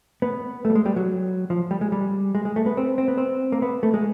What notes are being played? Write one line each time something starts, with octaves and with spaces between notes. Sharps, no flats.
B3
A3
G3
G#3
G3
F#3
F3
G3
G#3
G3
G#3
G#3
A3
B3
C4
C4
B3
C4
A#3
B3
A3
G#3